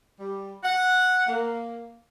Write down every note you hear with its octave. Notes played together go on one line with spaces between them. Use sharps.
G3
F#5
A#3